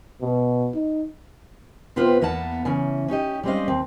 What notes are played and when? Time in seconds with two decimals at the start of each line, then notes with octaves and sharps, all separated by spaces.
0.21 B2
0.75 D#4
1.96 C3 B3 C4 F4 B4
2.21 E2 A#3 B3 F#5 A5
2.65 C#3 E3 C#4
3.08 C#4 D#4 G4 D#5
3.43 G3 G#3 C4 C#4 D#5 F5
3.68 D#2 C4